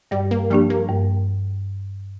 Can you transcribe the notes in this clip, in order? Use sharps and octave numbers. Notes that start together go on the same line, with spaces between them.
G2 G3
A#3
F3 G3 A#3 D4 G4
A#3
G2